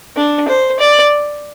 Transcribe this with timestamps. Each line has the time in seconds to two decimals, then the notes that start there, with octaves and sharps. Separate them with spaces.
0.17 D4
0.48 C5
0.80 D5